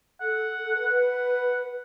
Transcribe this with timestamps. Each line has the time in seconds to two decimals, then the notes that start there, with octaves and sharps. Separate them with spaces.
0.21 A4 F#5
0.58 A4
0.77 B4
0.95 F#5